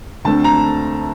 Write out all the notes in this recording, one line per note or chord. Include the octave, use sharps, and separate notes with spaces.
D2 D3 A3 C4 A5
A#5